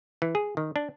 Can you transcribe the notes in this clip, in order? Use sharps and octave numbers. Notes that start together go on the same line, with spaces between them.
E3
G#4
D#3
D4